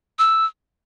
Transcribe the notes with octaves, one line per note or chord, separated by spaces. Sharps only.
E6